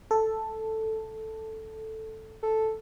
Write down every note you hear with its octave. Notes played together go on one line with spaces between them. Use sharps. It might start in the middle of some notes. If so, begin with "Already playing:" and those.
A4
A4